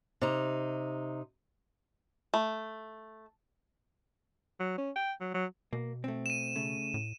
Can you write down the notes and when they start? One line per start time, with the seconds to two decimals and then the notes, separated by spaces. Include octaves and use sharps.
0.21 C3 D#4
2.34 A3
4.59 F#3
4.78 C#4
4.96 G5
5.20 F#3
5.34 F#3
5.73 B2 A#3
6.04 A3 C4
6.26 D#7 E7
6.56 C#3 A3
6.94 A2